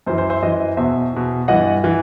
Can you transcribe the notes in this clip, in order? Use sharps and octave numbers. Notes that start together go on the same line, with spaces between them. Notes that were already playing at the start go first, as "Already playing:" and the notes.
F#2 E3 C5
C5
C5 E5
F#2 E3 D#5
E2 B2 C5 E5
E2 B2
G2 E3 D#5 F#5
E3